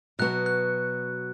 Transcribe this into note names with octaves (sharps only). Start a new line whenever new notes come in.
B2 F#3 B3 F#4 F#6
F#6